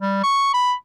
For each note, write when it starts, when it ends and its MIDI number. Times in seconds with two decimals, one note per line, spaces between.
0.02 0.22 55
0.24 0.53 85
0.54 0.74 83